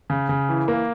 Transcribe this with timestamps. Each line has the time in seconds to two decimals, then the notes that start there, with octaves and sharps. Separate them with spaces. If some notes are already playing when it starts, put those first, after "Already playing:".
0.10 C#3
0.29 C#3
0.49 E3
0.68 A#3